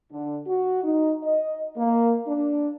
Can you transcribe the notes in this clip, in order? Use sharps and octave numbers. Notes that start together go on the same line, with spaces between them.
D3
F#4
D#4
D#5
A#3
D4